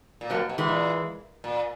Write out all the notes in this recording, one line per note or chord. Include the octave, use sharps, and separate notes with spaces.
A#2
B2 F#3 A#3
B2
E3 G#3
A#2
A#2